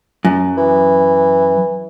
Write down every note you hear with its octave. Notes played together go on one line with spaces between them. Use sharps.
F#2
E3